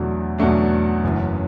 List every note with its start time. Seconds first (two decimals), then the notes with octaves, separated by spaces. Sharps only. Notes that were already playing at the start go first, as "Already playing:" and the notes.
Already playing: E2 B2 F#3 A3 D4
0.38 E2 B2 F#3 A3 D4
1.04 F#1 F#2 E3